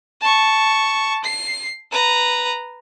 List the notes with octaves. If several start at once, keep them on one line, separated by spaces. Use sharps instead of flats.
A5 C#6
C7
B4 A#5